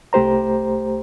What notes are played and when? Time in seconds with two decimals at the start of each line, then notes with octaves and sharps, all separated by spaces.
0.13 C2 A3 G4 C5 A#5